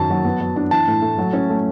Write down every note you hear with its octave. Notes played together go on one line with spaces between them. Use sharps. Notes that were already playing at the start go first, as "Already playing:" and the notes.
Already playing: F#2 D#3 A5
F#3
B3
F#3
D4
E3 A5
A2
A3
F#3
C#4
A3